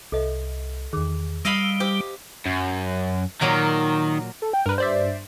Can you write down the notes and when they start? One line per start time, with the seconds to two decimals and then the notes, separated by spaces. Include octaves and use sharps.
0.12 C2 A4 D#5 E5
0.93 E2 D#3 G#4
1.45 G3 D#5 F5 B5 E6
1.80 G4 C5
2.46 F#2
3.41 A#2 D#3 F#3 A#4
4.42 A4
4.53 G5
4.66 G2 A#4 B4
4.78 C5 D5 E5